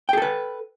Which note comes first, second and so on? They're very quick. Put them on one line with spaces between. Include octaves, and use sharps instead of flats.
G5 G#4 A4 B4